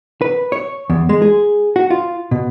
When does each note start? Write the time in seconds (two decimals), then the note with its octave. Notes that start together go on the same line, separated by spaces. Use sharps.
0.22 B4
0.52 C#5
0.90 E2
1.09 G#3
1.22 G#4
1.76 F#4
1.90 F4
2.31 B2